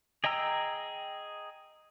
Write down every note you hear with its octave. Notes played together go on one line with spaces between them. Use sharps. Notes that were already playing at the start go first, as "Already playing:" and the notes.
G#4 D#5 G5 A#5 E6